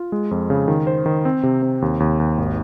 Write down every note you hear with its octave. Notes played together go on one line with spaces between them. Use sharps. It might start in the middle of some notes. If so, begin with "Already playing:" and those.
Already playing: F4
G#3
F2
C#3
D#3
C5
D#3
C4
C3
C4
D#2
D#2
D#2
G#1